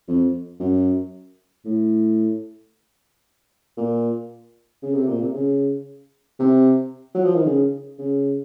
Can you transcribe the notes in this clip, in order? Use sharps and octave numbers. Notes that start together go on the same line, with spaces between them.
F2
F#2
A2
A#2
C#3
C3
A#2
C3
C#3
C3
F#3
F3
D#3
C#3
C#3